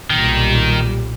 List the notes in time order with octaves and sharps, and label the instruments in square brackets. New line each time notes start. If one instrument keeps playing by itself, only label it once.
[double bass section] B1 A#2 G3 [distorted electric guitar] D#3